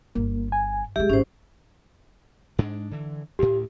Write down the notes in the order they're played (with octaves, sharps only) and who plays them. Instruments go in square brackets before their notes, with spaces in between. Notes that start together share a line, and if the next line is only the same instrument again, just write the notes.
[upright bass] G1 [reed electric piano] A#3
[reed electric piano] G#5
[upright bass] C2 G#3 [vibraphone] G4 G#4 [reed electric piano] E5
[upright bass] G#1 [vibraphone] C#4 C5
[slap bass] G#2 G#3 D4
D3 E3
[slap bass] D2 A2 [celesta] G4